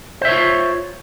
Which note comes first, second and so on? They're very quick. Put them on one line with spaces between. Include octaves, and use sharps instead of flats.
C5 E5 C#5 F4